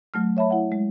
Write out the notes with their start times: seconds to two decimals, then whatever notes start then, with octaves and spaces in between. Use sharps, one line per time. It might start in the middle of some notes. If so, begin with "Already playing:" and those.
0.14 F#3 A3 F6
0.37 C#5 E5 A5 B5
0.50 E4 F#5
0.72 G#3